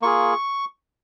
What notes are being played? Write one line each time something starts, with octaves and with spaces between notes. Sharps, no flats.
A#3 F4 G#4 C#6